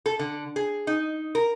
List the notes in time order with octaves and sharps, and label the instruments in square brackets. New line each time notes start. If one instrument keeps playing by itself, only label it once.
[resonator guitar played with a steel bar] A4
D3
G#4
D#4
A#4